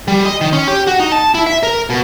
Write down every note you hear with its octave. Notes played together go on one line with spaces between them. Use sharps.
G3
D#5
D#3
C#4
G4
F#4
D#4
A5
E4
E5
A#4
B2